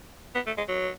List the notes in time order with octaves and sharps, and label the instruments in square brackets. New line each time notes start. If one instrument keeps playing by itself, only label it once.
[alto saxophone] B3
A3
G#3
F#3